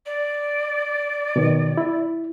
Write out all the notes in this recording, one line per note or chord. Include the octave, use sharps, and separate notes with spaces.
D5
B2 D#3
E4